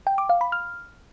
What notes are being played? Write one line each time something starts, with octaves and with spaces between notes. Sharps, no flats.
G5
D6
F5
B5
F6